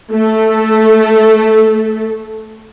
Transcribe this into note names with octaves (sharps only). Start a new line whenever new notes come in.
A3 A4